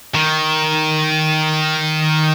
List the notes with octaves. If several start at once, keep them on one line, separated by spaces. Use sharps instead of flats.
D#3